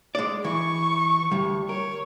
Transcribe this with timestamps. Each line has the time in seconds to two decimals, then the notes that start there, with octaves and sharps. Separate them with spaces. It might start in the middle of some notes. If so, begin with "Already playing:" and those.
0.15 G#3 D5
0.44 E3 C#6
1.31 D2 G3
1.69 A#4 C#5